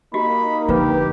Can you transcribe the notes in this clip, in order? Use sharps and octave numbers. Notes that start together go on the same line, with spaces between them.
A#3 D#4 F#4 G4 B5
F2 D3 F4 G4 B4